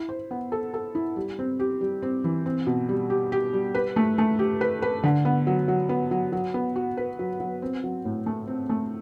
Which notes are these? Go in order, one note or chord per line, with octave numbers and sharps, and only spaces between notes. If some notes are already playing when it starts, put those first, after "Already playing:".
Already playing: E4
C5
B3
A4
A4
E4
G3
C4
G4
G3
C4
E3
C4
B2
G3
G4
G4
G3
B4
A3
A3
G4
B4
B4
D3
B3
F#3
F#3
B3
F#3
F#3
B3
F#4
B4
F#3
F#3
C4
F#3
A2
A3
C4
A3